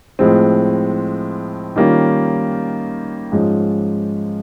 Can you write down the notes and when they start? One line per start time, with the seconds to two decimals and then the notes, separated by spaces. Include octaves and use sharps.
0.19 A2 F3 G#3 C4
1.76 D#3 G3 A#3 C#4 F4
3.32 G#2 F3 G#3 C#4